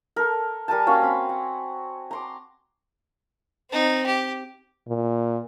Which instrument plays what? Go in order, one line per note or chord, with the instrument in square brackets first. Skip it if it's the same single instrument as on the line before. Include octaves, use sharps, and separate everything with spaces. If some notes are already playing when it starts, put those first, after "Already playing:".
[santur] A4 A#4
G3 A#4 G#5 A5
A#3 C#4 F#4 F5
C4 B5
F#5
A#5 C6 D6
[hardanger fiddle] C4 D#4
G4
[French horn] A#2